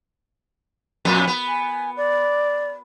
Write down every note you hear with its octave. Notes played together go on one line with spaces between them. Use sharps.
F2 A#2 B3
B3
G#5
D5